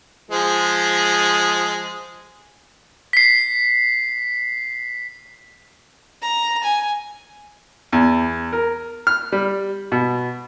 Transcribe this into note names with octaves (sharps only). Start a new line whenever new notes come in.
F3 G#3
B6 C7
A#5
G#5
E2
A#4
F6
G3
B2